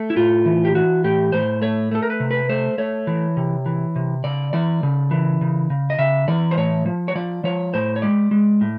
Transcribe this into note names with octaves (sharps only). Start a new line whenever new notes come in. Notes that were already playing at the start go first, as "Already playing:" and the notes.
Already playing: A3
E4
A2 F4
E3
G4
E3 F#4
A2 G4
A2 C5
A3 C#5
A3 A4
A#4
B4
C3
B4
A3 C5
A3 C#5
E3
C3
E3
C3
C#3 D5
E3 D5
C#3
E3
C#3
C#3
D#5
C#3 E5
E3 D5
C5
A2 C#5
F3
C#5
F3 D5
F3 C#5
A2 C5
C#5
G#3 D5
G#3
A2